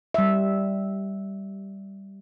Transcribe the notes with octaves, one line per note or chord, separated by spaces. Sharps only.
G3 E5